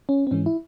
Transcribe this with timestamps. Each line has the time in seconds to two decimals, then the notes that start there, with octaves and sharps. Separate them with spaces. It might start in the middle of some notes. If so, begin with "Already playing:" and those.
0.09 C#4
0.27 C4
0.31 G#2 E3 G#3 C#4
0.46 E4